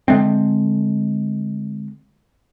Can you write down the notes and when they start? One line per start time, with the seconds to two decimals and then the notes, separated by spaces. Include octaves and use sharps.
0.08 D3 G#3 A3 C4